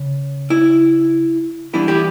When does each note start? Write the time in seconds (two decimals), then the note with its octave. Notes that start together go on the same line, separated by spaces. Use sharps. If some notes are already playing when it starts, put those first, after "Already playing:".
Already playing: C#3
0.50 E4
1.73 E3 G3 B3 D4 E4
1.88 E4 G4